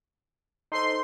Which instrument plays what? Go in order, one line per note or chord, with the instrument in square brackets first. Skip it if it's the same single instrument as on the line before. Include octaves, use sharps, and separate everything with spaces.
[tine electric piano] D#4 A4 C5 [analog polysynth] C6